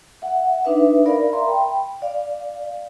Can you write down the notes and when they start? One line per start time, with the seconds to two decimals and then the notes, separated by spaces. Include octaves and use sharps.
0.22 E5 F#5
0.65 D4 D#4 B4 E5
1.05 A#4 D5 F5 B5
1.33 E5 A#5 C6
1.48 G5 B5
2.02 D5 F5